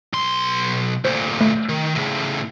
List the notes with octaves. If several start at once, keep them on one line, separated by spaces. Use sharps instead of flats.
B1 C6
D2 A#2 C5
A3
D#3
A2 C#3